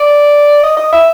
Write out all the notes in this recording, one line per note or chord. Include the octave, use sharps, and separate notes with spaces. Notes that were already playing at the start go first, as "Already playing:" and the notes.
Already playing: D5
D#5
D#5
E5